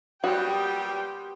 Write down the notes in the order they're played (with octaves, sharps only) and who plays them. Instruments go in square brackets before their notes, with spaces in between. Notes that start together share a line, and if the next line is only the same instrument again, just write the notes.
[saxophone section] A#2 F#3 G3 [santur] B3 G4 C5 [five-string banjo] F#4 [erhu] G5